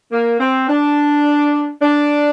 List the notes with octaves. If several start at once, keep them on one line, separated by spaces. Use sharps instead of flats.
A#3
C4
D4
D4